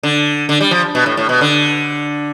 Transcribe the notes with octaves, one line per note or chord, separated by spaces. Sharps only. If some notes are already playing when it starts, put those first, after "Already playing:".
D3
D3
G3
F3
B2
A2
A2
B2
D3